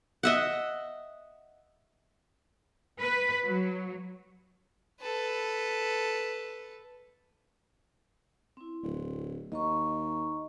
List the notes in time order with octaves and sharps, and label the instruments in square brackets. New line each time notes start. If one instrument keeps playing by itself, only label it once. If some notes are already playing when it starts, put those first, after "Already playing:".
[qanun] D#5 E5 F#5
[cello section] B4
F#3
[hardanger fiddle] A4 B4
[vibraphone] C4 E4
[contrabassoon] D1
[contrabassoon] D#2 [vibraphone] D#5 A#5 C#6